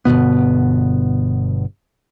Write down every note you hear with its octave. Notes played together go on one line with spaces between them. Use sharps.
G1 G#2 B2 B3